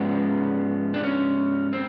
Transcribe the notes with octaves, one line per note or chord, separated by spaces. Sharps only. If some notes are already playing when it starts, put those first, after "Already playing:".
Already playing: G#2 F3 G#3 B3 C#4
D4
C#4
C4